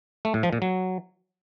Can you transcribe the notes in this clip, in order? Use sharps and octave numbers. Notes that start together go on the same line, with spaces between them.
A3
A2
F3
A#2
F#3